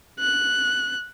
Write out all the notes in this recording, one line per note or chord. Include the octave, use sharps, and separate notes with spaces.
F#6